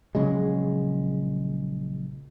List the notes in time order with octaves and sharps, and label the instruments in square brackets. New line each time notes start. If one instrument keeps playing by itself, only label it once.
[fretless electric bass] A#1 C#3 F#3 G#3